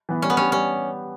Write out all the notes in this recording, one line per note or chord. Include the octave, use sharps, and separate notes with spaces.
E3 B3
G3 C#4
B3
C#4 D4 G4
G3 C#4